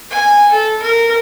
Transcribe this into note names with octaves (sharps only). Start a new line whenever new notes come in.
G#5
A4
A#4